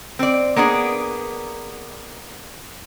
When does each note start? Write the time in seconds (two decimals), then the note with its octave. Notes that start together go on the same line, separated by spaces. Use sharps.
0.19 C4 D5
0.56 A#3 B3 D4 G#4